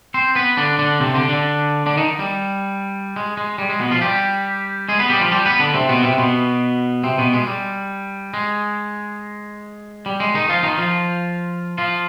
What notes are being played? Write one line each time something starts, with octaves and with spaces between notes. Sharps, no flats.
C4 C5
B3 B4
D3 D4
D3 D4
C3 C4
D3 D4
D3 D4
D3 D4
D#3 D#4
G3
G#3
G#3
G3
G#3
B2 B3
F3 F4
G3 G4
G#3 G#4
B3 B4
G3 G4
F3 F4
G3 G4
B3 B4
D3 D4
C3 C4
B2 B3
C3 C4
B2 B3
C3 C4
B2 B3
G#3
G3
G#3
G3
G#3
D#3 D#4
F3 F4
D#3 D#4
F3 F4
F3 F4